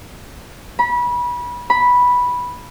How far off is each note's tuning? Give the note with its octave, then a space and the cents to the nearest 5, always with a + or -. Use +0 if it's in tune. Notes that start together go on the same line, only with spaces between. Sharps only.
B5 -25
B5 -5